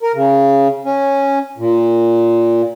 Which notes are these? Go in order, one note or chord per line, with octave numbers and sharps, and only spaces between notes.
A#4
C#3
C#4
A#2